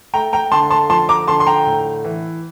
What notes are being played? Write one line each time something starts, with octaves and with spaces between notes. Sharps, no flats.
A3 G5 A#5
G5 A#5
D3 A5 C6
A5 C6
F3 A5 C6
A#5 D6
D3 A5 C6
C6
G5 A#5
A2
E3